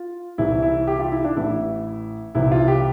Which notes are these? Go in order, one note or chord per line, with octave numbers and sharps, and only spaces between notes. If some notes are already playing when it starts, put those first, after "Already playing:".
Already playing: F4
C2 C3 E3 E4
E4
G4
F4
E4
D4
A1 A2 E3 E4
C2 C3 E3 E4
F4
G4